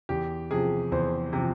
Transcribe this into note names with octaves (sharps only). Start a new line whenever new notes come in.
E2 G4
C3 F3 G#4
E2 C5
C3 F3